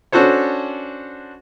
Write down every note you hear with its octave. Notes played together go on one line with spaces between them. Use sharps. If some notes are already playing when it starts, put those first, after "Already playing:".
C#4 D4 F#4 A4 C5 C#5